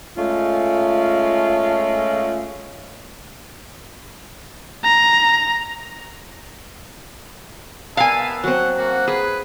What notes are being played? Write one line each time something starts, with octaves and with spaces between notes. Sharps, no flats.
G#3 A3 C#4 F4
A#5
B3 A#4 E5 F5 G#5 A5
F#3 C4 F#5
A#3 F#4 F#5
G#4 B4